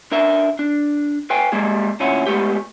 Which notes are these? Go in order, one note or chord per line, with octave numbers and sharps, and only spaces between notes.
D4 A#4 E5
D4
B4 F5 G5 G#5
G3 G#3 A#3 G#4
D2 A#2 C#4 E4 F#5
G#3 A3 B3 G4